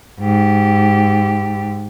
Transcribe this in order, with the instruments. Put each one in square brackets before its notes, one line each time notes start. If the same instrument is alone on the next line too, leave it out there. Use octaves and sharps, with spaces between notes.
[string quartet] G#2 G4